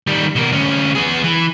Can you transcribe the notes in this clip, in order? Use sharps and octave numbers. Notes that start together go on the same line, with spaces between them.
D#3 G3
B2 A#4
D2 C#4
B3 G#4
E3